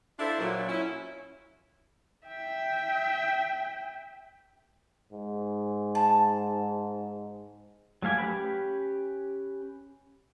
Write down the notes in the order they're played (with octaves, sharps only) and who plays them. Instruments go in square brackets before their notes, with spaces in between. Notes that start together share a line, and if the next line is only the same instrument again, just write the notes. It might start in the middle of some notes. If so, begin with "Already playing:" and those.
[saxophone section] D4 E4 F4 A4 C5
A#2 F#3
C#4 E4
[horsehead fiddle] E5 G5
[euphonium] G#2
[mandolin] A5
[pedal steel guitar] F#3 A3 F5 G#5 D6
C#4 G4 B4 B5